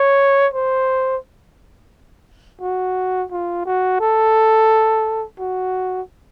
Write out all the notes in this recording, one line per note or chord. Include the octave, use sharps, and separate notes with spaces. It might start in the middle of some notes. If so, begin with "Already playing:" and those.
Already playing: C#5
C5
F#4
F4
F#4
A4
F#4